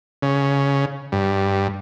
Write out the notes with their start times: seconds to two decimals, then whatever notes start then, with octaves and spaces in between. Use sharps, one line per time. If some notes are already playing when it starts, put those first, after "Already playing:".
0.23 C#3
1.12 G2